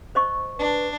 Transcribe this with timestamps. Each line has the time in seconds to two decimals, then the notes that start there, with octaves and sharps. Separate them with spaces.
0.15 C5 D#5 C#6
0.59 D4 B4